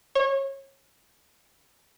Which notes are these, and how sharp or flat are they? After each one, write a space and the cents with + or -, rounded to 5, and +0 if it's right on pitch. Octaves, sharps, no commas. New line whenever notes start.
C#5 -30